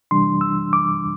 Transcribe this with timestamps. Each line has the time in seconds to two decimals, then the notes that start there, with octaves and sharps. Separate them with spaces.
0.11 C3 E3 G3 D4 C6
0.41 E6
0.73 D6